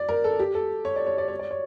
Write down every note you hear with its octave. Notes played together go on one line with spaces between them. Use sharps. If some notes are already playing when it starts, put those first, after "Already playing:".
Already playing: D5
A#4
A4
G4
A4
C#5
D5
C#5
D5
C#5
D5
C#5